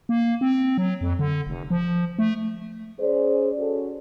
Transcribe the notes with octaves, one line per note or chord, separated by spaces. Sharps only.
A#3
C4
F#3
F2
D3
F1
F3
A3
C#4 G#4 C5 D5
C#4 F#4 A4